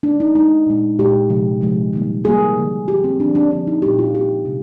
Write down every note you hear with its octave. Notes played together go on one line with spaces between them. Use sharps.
D#3 G#3 D4
D#4
D#3 G#3 D#4
A#2 G#3
A#2 G#3 G4
C3 F3 G#3
C3 F3 G#3
D#3 G3 A#3
D#3 G3 A#3 G#4
D3 F3 A#3
D3 F3 A#3 G4
C4
D3 F3 A#3 D4
D4
D3 F3 A#3 D4
D#4
A#2 G3 A#3 G4
F4
A#2 G3 A#3 G4
C3 D#3 G#3